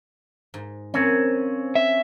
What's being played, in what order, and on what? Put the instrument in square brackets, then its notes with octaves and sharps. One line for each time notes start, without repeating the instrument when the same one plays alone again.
[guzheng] G#2
[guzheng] F3 A#3 [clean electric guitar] C4 C#4
[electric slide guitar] E5